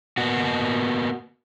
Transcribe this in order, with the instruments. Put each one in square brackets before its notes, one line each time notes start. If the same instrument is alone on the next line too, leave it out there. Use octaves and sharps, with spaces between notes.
[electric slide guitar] A#3 B3 F#4